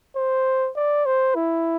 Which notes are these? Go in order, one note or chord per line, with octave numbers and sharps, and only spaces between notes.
C5
D5
C5
E4